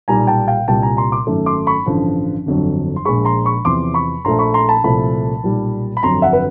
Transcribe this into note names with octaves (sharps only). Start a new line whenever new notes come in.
B1 A#2 G3 G#5 A#5
G5 A5
F5 G5
C2 A#2 G3 G5 A5
G#5 A#5
A#5 C6
C6 D6
G#1 F#2 D#3 F#3 A3
C6 D6
B5 C#6
A1 G2 D3 F3
G1 F2 D3 F#3
C6
A#1 A#2 F3 G#3 B5 C#6
A#5 C6
B5 C#6
E2 C3 F3 C6 D6
B5 C#6
A#1 A#2 F3 A3 A#5 C6
B5 C#6
A#5 C6
A5 B5
C2 A#2 F3 A3 A5 B5
B1 A#2 G3
B5
G1 F2 D3 F#3 A#5 C6
E5 F#5
B4